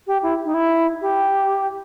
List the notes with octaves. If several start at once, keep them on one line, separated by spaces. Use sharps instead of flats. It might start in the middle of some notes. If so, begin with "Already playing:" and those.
G4
E4
D#4
E4
G4